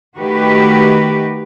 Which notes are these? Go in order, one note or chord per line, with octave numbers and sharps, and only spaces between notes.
D#3 A3 F#4 G4 B4